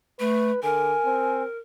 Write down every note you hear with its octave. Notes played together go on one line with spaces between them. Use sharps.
A3 B4
D3 A#4 G#5
C4